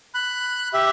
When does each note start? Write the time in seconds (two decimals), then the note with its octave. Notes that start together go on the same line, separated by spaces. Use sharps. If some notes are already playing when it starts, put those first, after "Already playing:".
0.14 B5 F#6
0.73 G4 E5